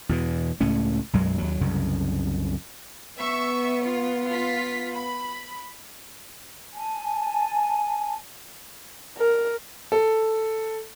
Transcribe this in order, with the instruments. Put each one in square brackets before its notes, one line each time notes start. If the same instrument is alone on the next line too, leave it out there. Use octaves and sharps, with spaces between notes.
[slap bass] E2 B2 E3
C#2 A2 A3 C#4
B1 F#2 F#3 G#3
D#2 F#3
C2 F#2 C#3
[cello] B3 [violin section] E5 C#6
[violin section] F4
F4 B6
B5
[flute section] G#5 A5
[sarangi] A#4
[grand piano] A4